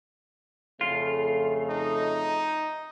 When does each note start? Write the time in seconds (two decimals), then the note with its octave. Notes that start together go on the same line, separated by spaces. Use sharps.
0.81 F2 C#3 A3 F4
1.70 D#4